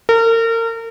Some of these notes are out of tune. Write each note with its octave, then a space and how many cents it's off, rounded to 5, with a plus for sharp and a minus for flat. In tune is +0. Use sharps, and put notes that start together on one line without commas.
A#4 -35